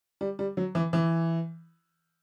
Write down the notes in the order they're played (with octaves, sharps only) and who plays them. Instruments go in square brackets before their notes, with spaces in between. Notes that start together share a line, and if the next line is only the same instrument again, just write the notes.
[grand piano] G3
G3
F#3
E3
E3